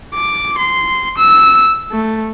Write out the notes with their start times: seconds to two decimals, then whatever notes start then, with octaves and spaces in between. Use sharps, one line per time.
0.15 D6
0.58 C6
1.18 E6
1.92 A3